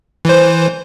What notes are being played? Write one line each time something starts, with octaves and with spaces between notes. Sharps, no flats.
E3 C5